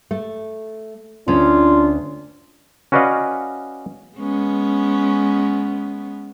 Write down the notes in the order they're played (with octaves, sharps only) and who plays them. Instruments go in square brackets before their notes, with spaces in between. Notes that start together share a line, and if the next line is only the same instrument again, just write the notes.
[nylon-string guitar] A3
[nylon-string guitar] D2 C#4 [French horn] D4 [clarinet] F4
[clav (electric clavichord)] C#4 F#4 B4 D5 D#5 F5
[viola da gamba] G#3 B3 C#4